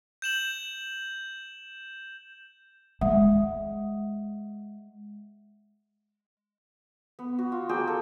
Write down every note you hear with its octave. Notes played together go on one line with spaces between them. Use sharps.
G6 E7 F#7
G#3 E5 F#5 D#6
B3
F#4
F4
A#3 F#4 G#4 G5
A4